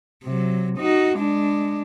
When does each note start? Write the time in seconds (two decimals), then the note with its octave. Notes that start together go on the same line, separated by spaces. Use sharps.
0.24 C3 F#3
0.78 D#4 F#4
1.18 G#3 D4